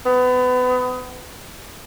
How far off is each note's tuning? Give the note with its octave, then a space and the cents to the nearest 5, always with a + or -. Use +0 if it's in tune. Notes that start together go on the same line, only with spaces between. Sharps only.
B3 +30